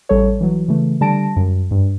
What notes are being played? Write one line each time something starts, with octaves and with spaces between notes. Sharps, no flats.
A1 G3 A4 C#5
E3 F#3
C#3 E3 A3
D3 G3 A5 A#6 D7
F#2
G2